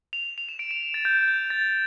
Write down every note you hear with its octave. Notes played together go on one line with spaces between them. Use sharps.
F7
F7
E7
D7
E7
A6
G6
G6
A6